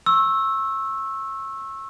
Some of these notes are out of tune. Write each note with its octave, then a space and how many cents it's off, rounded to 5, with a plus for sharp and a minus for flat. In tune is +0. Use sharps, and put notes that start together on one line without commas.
C#6 -30 E6 +0